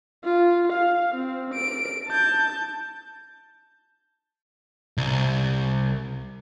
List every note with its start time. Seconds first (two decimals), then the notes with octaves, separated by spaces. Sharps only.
0.24 F4
0.72 F5
1.15 C4
1.54 D7
2.08 A5 G6
4.98 C2